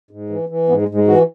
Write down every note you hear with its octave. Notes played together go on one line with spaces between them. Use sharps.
G#2
E3
E3
G#2 B3
G#3
G#2
G#3
E3 F#4